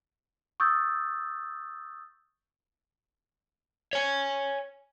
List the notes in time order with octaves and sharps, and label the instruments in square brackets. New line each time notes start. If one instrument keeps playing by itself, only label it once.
[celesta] C#6 D#6 E6 G6 A6
[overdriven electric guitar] C#5 G#5